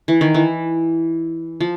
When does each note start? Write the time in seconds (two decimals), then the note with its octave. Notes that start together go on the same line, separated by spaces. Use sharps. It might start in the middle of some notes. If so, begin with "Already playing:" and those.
0.08 E3
0.21 D#3
0.34 E3
1.60 F3